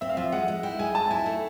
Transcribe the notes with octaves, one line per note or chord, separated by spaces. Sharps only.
C4 E5
F5
F3 E5
G#3 F#5
G#3
E4 G5
G#3 G#5
C4 A5
E4 G#5
A3